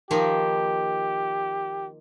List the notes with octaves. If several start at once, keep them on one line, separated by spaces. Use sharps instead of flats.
D#3 F3 A#3 G4